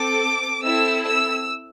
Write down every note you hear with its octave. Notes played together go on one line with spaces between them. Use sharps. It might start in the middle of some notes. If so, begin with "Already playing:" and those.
Already playing: C4 A4 D6
C4 E4 A4 E6
E6